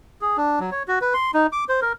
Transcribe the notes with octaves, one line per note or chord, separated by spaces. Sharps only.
G#4
D4
F#3
C#5
F#4
B4
C6
D#4
D6
C5
A#4